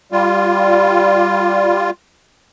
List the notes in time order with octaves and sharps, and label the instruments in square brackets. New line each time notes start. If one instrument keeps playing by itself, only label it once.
[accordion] G3 F4